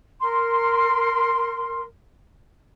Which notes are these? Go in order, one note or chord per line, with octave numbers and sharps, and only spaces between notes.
A#4 C6